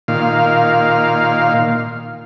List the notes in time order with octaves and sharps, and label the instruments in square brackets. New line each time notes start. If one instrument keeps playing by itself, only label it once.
[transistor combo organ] A#2 D#3 F5